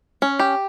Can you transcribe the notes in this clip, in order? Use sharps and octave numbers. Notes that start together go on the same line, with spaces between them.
C#4
G4